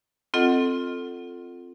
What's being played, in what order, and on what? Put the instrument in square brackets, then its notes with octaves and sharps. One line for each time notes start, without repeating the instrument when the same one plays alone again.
[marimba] C4 F4 A4 D#5 F#5